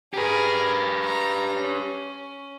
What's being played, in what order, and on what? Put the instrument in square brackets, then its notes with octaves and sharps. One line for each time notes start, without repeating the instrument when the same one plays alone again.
[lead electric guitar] G4 B4 [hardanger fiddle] G#4 A#4
[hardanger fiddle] A#5
C#4